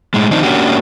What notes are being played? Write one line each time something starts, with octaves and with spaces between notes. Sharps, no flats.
A2 G#3
D#3 F3 C4 D4 D#4
A#3 C#4 D4 F#4 G4